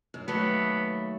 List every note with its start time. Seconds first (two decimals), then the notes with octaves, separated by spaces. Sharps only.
0.14 F#2
0.28 D#2 F#3 A3 B3